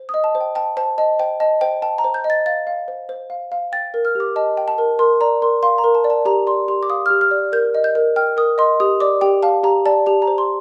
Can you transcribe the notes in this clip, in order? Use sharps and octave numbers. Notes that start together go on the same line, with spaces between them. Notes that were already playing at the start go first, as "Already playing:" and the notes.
Already playing: C5
D#6
D#5
A5
C5
G5
G5 A5
C5 A5
D#5 A5
C5 G5
D#5 A5
C5 G5
G5 A5
A#5
C5
G6
D#5
A6
F5 A6
F5
C5
C5
F5
F5
G5 A6
A#4
F6
G4 D6
D#5 A5
G5
A5
A#4
A#4 C6
D5 A#5
A#4 C6
F5 C6
A#5
A#4
A5
D5
A5
G4 A#5
D5 C6
G4 C6
D6
F5 D#6
G4 F6
F6
D5
A#4 G6
D#5
G6
A#4
G5 F6
A#4 D#6
D#5 C6
G4 D#6
D5 D6
G4 G5
F5 A5
G4 A#5
D5 A5
G4 A5
A#5
C5
C6